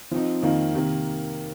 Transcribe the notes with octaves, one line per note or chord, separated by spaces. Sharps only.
F3 C4 D#4
F2 D#3 A#3 D#4
C3 D#3 A#3